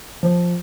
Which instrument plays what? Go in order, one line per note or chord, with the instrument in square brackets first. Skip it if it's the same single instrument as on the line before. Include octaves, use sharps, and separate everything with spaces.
[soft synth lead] F3